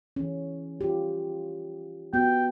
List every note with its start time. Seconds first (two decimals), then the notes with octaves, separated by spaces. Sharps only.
0.16 E3 C#4
0.81 F4 G4
2.14 B3 F#4 G5